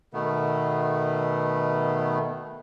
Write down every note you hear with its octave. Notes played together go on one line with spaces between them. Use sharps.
B2 D#3 A3 B3